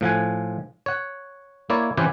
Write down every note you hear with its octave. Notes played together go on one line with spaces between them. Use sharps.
A2 F3 F#5 G#5
C#5 F#5
A#3 E4 C#5 D5
E3 C4 C#4 G4 B4 C#5